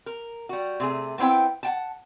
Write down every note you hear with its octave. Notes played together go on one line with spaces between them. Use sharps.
A#4
G3 F#4
C3 A3 G#4
A3 B3 C4 E4 G5
F#5 G5 A5